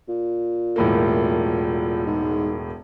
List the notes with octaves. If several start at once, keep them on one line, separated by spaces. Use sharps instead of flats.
A#2
E1 A2 A#3
G#2